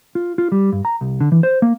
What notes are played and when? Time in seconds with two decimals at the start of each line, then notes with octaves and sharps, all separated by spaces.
0.15 F4
0.38 F4
0.52 G3
0.72 G2
0.85 A#5
1.01 C2
1.21 D3
1.32 E3
1.43 C5
1.62 A#3